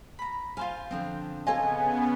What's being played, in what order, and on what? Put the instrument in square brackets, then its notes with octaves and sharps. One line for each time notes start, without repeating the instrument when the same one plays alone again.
[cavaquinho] A#5 B5
[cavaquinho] F4 C5 F5 [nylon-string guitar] G#5
[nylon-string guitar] D3 F3 C4
[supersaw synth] C#3 B3 [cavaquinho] F4 [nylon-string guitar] A4 C#5 D#5 [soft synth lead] G#5